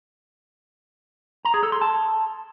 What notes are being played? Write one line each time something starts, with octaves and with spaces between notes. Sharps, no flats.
A#5
G#4
A4
C6
A5